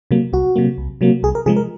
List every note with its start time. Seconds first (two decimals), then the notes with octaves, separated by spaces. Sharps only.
0.11 C3 F#3 A#3
0.33 C2 F#4
0.56 C3 F#3 A#3
0.78 C2
1.01 C3 F#3 A#3
1.23 C2 G#4
1.35 A#4
1.46 C3 F3 G#3 G#4
1.56 A#4